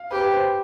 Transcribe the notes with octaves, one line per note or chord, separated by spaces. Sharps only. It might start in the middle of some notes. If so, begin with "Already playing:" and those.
Already playing: F5
G4 B4
B4
C5